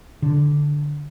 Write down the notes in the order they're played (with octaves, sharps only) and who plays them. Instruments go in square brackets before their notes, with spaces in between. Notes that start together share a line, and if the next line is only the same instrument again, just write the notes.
[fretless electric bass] D3